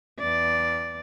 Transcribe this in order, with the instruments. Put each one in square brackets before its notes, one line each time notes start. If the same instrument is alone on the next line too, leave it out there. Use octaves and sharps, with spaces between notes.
[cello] E2 D5